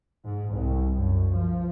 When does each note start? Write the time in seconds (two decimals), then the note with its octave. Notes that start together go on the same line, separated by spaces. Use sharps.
0.24 G#2
0.53 C2
0.91 F#2
1.33 F3